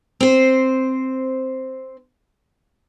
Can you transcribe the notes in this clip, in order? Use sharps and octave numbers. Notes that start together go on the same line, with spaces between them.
C4 C5